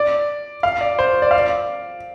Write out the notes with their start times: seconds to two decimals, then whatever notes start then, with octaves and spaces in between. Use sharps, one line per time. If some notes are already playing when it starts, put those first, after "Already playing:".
Already playing: D5
0.63 F5
0.81 D5
0.99 C5
1.22 D5
1.31 F5
1.39 D5